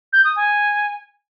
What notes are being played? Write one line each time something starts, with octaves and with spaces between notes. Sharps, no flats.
G6
D#6
G#5